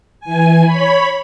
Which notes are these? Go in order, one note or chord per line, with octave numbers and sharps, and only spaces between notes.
E3 G#5
C#5 B5